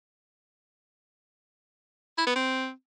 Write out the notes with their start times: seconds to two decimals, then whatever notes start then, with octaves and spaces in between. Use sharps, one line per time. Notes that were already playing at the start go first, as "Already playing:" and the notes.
2.18 E4
2.27 B3
2.36 C4